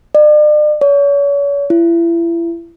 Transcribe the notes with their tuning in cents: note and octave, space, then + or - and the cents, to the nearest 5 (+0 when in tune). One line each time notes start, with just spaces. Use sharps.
D5 +40
C#5 +40
E4 +35